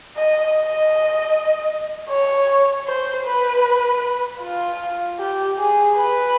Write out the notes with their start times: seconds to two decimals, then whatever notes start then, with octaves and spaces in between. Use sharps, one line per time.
0.17 D#5
0.56 D#5
2.09 C#5
2.87 C5
3.25 B4
4.41 F4
5.19 G4
5.58 G#4
5.97 B4